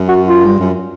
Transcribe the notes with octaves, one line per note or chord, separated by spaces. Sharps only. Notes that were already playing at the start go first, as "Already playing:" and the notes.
Already playing: F#2
F#4
F4
G2
F#2